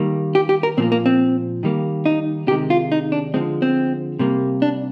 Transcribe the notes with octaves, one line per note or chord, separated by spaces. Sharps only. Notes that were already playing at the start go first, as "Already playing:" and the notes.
Already playing: D#3 G3 A#3
G4
G4
A#4
A#2 F3 A#3 C4
A#3
C4
D#3 G3 A#3
D#4
C3 D#3 G#3 G4
F4
D#4
D4
D3 F3 G#3 C4
C4
C3 G3 A#3
D4